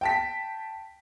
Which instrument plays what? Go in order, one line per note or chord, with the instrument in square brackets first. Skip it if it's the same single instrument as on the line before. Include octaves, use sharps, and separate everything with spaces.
[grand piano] G5 A5 B6